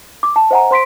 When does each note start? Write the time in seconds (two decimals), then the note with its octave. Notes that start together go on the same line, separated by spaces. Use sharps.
0.23 D6
0.36 A5
0.51 C5 D#5 F#5 G#5 A#5
0.71 C5 C6 B6 D7